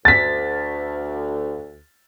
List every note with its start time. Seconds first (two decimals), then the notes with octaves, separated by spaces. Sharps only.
0.05 D2 A6 B6